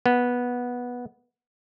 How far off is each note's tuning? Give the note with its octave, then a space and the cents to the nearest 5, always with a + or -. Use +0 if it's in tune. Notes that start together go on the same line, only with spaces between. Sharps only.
B3 -10